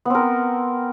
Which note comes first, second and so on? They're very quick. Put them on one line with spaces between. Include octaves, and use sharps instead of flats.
B3 C4 A#4